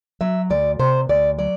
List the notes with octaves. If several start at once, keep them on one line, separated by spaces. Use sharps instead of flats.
F#3 E5
D2 D5
C3 C5
D2 D5
F#3 D5